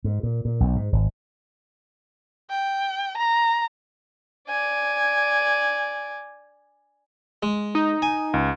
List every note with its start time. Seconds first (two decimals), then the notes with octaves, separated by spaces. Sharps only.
0.04 G#2
0.23 A#2
0.45 A#2
0.60 B1
0.76 G#2
0.92 G#1
2.50 G5
3.17 A#5
4.48 D5 G#5
7.43 G#3
7.75 D#4
8.02 G#5
8.34 C#2